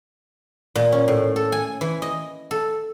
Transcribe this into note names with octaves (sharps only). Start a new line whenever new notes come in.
A#2
C#4
A2
A4
G#5
E3
D#5
A4